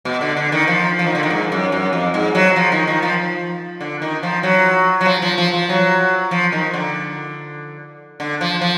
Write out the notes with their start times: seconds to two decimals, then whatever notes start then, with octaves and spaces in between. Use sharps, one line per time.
0.05 B2
0.21 D3
0.37 D3
0.52 D#3
0.68 F3
0.99 F3
1.07 D#3
1.15 D3
1.23 D#3
1.30 G#2
1.52 F#2
1.72 F#2
1.93 F2
2.14 G#2
2.35 F#3
2.56 F3
2.72 D#3
2.87 D#3
3.02 F3
3.81 D3
4.02 D#3
4.23 F3
4.43 F#3
5.01 F#3
5.06 F3
5.22 F3
5.38 F3
5.54 F3
5.69 F#3
6.31 F3
6.52 D#3
6.74 D3
8.20 D3
8.41 F3
8.61 F3